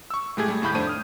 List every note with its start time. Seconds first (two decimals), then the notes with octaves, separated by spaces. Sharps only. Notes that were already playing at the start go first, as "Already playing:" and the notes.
0.10 C#6 E6
0.37 A2 G#3 A3 G4 G#4 G#6
0.48 G3 A3
0.62 D#2 A2 A3 B5 G6
0.74 F2 A3 D4 C5 D#7
0.87 D#6 F6